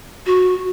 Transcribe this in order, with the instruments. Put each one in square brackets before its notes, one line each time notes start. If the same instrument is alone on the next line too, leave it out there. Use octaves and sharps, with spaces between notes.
[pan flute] F#4